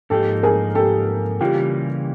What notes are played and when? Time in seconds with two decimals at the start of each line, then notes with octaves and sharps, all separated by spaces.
0.10 G#2 F3 A#3 D#4 G4 A4
0.43 G#4 A#4
0.75 G4 A4
1.41 C#3 E3 G3 A#3 F4 G4